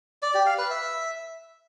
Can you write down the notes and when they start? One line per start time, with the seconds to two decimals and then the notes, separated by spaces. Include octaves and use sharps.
0.22 D5
0.34 G4
0.46 F5
0.58 B4
0.70 E5